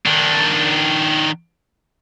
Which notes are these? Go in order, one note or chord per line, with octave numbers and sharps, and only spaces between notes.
D#3 D4